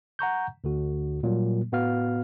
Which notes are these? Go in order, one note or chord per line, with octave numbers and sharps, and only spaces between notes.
F#5 A#5 C#6 G6
D2 D3 F#4
A#2 F#3 G3 A#3
A2 B3 F#4 F5 F6